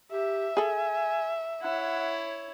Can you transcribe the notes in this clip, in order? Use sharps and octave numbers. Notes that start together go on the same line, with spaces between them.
G4 E5
G#4 A4 G#5
E4 C#5 F#5